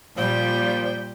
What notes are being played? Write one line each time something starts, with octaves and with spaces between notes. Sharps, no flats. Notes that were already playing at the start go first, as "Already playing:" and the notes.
A#2 F3 G3 D5 G5